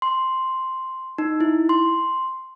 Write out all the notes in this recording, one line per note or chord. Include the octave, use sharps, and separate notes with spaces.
C6
D#4
E4
C6